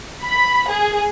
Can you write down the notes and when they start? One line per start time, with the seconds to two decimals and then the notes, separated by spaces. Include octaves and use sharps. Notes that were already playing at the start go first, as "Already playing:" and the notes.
0.22 B5
0.69 G#4